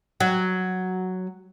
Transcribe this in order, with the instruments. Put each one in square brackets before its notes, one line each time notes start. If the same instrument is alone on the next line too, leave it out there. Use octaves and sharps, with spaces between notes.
[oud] F#3